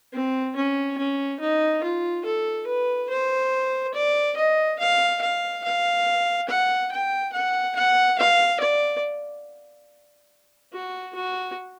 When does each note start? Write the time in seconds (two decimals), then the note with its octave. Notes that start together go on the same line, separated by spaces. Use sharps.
0.13 C4
0.56 C#4
0.98 C#4
1.40 D#4
1.83 F4
2.25 A4
2.67 B4
3.10 C5
3.94 D5
4.37 D#5
4.79 F5
5.21 F5
5.64 F5
6.49 F#5
6.91 G5
7.33 F#5
7.75 F#5
8.18 F5
8.60 D5
10.72 F#4
11.15 F#4